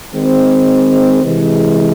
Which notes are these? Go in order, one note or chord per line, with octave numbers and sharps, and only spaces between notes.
D#3 G#3 C4
C3 E3 G#3